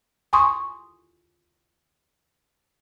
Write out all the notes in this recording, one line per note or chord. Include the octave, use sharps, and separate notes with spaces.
G#5 C6 C#6 D#6